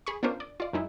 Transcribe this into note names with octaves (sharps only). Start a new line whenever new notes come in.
G#4 B5 C#6
B3 C#4 D4 F4 A#4 C5
D5
F4 D5
F#2 G#3 D#4 E4